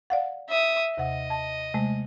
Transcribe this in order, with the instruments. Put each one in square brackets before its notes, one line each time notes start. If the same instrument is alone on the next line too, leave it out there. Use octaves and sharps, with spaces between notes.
[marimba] D5 F5 F#5
[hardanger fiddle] E5 D#6
[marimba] D#2 C3 F#5 [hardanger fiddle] D#5
[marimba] A5
C3 G#3 A3